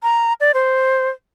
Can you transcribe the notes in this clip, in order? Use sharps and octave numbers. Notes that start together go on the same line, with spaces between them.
A#5
D5
C5